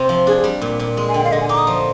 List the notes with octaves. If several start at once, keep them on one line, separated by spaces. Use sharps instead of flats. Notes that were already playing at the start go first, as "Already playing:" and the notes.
Already playing: C3 C4
F3
D4 G#4
G#4
G3
A#2
A#2
G#3
G#5
D3 G5
F5
D3 D#5
G#5
D#4 D6
D#6
F3